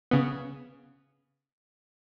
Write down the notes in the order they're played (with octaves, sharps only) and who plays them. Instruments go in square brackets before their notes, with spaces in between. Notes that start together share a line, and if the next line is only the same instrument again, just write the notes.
[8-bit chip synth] C#3 B3